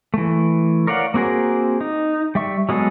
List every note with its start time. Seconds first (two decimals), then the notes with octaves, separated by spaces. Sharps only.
0.14 E3 A3
0.87 A#4 C#5 D5 F5 F#5
1.14 A#3 C4 F#4 G#4 A#4
1.81 D#4
2.35 G3 E5 C#6
2.69 F#3 G#3 B3 G#4 A4